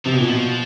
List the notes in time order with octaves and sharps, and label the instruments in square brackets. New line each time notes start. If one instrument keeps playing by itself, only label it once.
[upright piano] C3 [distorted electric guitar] F3
[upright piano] B2
[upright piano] A#2 [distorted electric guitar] E3
[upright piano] B2 [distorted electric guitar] F3